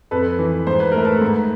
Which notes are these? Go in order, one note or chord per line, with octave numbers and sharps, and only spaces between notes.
F2 A4 B4
E3
G#2 C5
B4
A3 A#4
A4 B4
G#2